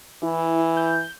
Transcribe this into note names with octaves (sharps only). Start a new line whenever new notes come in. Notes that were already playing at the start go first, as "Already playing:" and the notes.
E3 E4
G6